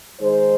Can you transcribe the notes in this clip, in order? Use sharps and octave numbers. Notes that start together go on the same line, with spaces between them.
D#3 G#3 D#4 G#4 C5